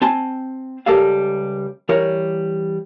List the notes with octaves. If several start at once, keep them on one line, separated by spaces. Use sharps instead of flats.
C4 G#5 A5 C6
C#2 G3 G4 A4 A#4 F5
E3 G3 A#4 C#5